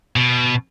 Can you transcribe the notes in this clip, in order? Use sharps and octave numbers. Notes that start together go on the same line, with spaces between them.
B2